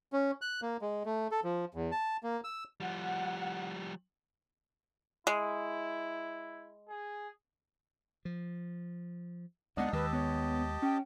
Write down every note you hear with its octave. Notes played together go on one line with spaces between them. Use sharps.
C#4
F#6
A#3
G#3
A3
A4
F3
E2
A5
A#3
E6
F3 G3 F#5
G#3 E4
G#4
F3
D2 G#3 B3 D4 D#4 D5 D#5 F#5
D#2 D#3 G#3 G4 B4 D#5 A5 E6
B3 C#5
C#4 G5